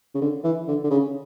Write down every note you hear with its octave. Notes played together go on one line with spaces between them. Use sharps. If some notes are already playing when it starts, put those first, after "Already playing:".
C#3
D3
E3
D3
D3
C#3